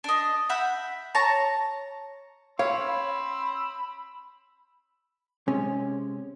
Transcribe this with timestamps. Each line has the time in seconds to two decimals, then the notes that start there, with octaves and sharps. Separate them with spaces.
0.04 D4 D#5
0.49 E5 F#5 B5 G6
1.15 C#5 A5 A#5 C#6
2.59 C#5 F5 B5 C6 E6
5.48 C3 G#3 C#4